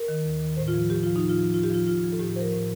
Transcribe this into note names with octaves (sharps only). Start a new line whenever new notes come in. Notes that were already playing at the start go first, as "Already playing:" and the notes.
Already playing: A#4
D#3
D#2
D#3
A2 C5
F4
F3
A2 G4
F3 F4
D#4
A2
F4
F3
A2 F4
G4
F3 F4
A2 F4
F3
A4
A2 G4
G4
F3 A#4 C5
A2